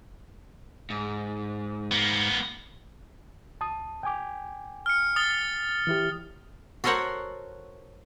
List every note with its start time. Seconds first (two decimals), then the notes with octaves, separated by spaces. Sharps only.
0.90 G#2
1.91 A#3 B3
3.60 C#2 A5 D#6
4.03 G5 G#5 D6
4.86 F6 C#7
5.16 D#6 A6 G7
5.87 E3 E4 G4
6.84 F#4 A4 A#4 C5 C#5 F#5